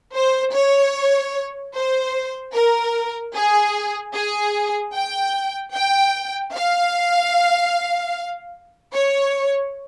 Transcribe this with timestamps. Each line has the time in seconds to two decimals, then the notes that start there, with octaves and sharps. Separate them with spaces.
0.14 C5
0.54 C#5
1.74 C5
2.53 A#4
3.34 G#4
4.14 G#4
4.94 G5
5.74 G5
6.54 F5
8.93 C#5